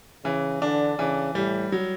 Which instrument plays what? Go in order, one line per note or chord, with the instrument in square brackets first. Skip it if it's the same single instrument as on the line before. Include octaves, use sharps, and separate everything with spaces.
[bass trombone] C#3 [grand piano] E3
[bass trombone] D3 [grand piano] D4
[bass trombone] C#3 [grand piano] E3
[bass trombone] A2 [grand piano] G3
[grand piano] F#3